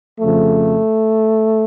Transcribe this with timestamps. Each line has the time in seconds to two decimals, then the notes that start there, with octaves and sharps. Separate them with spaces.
0.20 F2 C#3 F3 A3